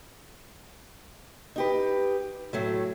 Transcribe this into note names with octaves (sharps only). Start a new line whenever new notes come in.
D#4 G4 B4
A2 F#3 A3